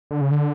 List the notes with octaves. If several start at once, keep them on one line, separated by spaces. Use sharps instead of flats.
D3
C#3
D3